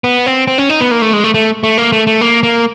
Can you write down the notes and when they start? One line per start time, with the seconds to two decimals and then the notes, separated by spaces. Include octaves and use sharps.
0.04 B3
0.26 C4
0.47 C4
0.58 C#4
0.69 D#4
0.80 B3
0.91 A#3
1.02 A3
1.13 G#3
1.24 A3
1.34 A3
1.63 A3
1.78 A#3
1.92 A3
2.07 A3
2.21 A#3
2.43 A#3